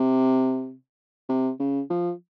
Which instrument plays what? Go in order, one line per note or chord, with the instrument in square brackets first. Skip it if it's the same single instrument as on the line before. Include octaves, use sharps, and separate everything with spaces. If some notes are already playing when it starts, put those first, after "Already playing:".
Already playing: [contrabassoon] C3
C3
C#3
F3